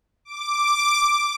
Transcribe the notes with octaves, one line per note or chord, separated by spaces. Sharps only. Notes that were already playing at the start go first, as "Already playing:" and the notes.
D6